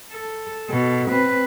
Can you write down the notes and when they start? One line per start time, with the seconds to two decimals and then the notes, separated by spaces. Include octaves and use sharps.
0.12 A4
0.68 B2 A4
1.08 C4 B4